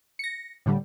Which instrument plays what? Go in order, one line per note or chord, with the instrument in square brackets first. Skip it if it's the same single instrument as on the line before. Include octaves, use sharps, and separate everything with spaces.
[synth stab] A#6 C#7
A2 D3 G3